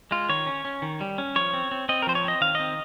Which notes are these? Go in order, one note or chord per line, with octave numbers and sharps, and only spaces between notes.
G#3 F4
D#3 C#5
C#4
C#4
D#3
G3
C#4
F3 C#5
C4
C4
C4 D#5
A#4
F3 C5
C#5
C4 D#5
D#3 F5
C4 D#5